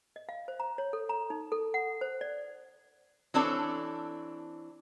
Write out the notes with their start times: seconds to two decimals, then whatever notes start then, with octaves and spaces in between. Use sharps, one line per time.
0.16 D#5
0.29 F5
0.48 C5
0.60 A#5
0.78 C#5
0.93 A4
1.09 A#5
1.30 D#4
1.52 A4
1.74 F#5
2.01 C5
2.21 D5
3.34 E3 C4 D4 A4 C#5